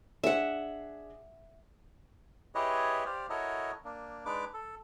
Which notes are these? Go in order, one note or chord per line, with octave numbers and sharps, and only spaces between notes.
D4 G#4 E5 F#5
E4 G4 G#4 B4 C#5 D#5
G4 C5 D5 F5
E4 F#4 A4 A#4 C#5 D#5
A#3 D4
G#3 D4 D#4 B4 D6
A4